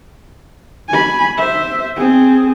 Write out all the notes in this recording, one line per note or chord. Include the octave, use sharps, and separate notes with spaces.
G#5 B5
C5 E5
C4 G#4